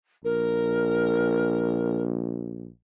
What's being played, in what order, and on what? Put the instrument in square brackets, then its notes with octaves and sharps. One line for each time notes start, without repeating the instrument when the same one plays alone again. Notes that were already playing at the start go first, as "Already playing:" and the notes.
[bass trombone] A#1 [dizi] A#4